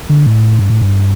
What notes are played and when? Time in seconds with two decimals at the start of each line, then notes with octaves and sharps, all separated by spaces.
0.09 D3
0.26 A2
0.59 G2
0.70 A2
0.81 G2